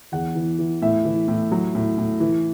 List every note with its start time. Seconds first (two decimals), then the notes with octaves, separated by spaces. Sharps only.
0.12 E2 F#5
0.35 E3
0.59 E3
0.82 A2 E5
1.05 E3
1.28 A2
1.52 F#3
1.75 A2
1.98 A2
2.20 E3